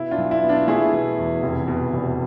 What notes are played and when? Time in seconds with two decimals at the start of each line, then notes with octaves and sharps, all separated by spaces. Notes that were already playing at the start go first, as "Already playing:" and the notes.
Already playing: B2 E4
0.11 D4 F4
0.18 B1
0.31 E4
0.43 B3
0.49 D4 F4
0.68 A3 E4 G#4
0.93 B2
1.18 E2
1.43 F1
1.68 B2
1.93 F1